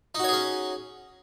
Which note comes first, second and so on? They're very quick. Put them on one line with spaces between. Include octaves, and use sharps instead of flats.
D#4 F#4 C#5 G#4 C#4